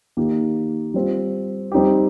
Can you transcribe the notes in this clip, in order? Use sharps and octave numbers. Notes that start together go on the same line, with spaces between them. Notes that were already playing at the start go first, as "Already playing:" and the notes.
D#3 A#3 D#4 G4
G3 C4 F4
G3 C4 D#4 G4